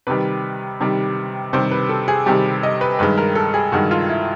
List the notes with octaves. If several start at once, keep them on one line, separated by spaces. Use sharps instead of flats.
C3 D#3 G3 B4
C3 D#3 G3
C3 D#3 G3 C5
B4
A4
G#4
C3 D#3 G3 G4
D#5
B4
G2 D#3 G#3 B4
A#4
A4
G#4
G2 D#3 G#3 F#4
F4
E4